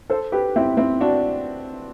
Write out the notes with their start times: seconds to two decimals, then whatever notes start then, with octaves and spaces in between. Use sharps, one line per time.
0.10 A4 C5
0.32 G4 B4
0.56 C4 E4
0.77 C4 E4
1.00 D4 F#4